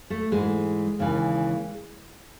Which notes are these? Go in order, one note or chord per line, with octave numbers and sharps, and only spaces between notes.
A3
G#2 E3 G#3
D#2 C#3 E3